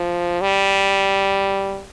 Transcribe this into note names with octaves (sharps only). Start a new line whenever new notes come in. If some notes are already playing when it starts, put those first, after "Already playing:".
Already playing: F3
G3